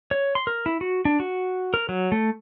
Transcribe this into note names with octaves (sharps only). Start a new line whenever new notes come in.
C#5
C6
A#4
E4
F#4
D4
F#4
A#4
F#3
A3